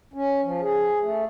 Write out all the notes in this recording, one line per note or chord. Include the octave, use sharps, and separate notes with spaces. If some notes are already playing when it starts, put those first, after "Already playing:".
C#4
F3
G#4
A3